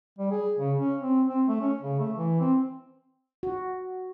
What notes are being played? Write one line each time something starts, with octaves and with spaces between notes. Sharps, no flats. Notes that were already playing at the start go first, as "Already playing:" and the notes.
G3
G#4
C#3
C#4
C4
C4
A3
C#4
C#3
A3
E3
C4
F#4